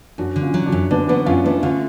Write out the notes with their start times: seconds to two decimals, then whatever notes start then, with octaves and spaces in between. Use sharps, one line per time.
0.18 F#2 D4 F#4
0.36 D3
0.42 C#4 F4
0.54 F#3
0.66 D4 F#4
0.72 F#2
0.91 D3 B3 D4
1.08 F#3 B3 D4
1.26 F#2 C#4 F4
1.44 A3 B3 D4
1.63 D3 C#4 F4